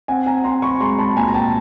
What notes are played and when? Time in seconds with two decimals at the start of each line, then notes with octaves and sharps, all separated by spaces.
0.08 C4 F#5 G#5
0.26 G#5 A#5
0.44 C4 A#5 C6
0.62 B5 C#6
0.80 G#3 A#5 C6
0.99 A5 B5
1.16 A#2 G#5 A#5
1.28 A#5
1.34 G5 A5